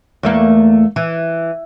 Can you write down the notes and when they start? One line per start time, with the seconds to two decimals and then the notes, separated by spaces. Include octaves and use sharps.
0.23 E2 A3 A#3
0.96 E3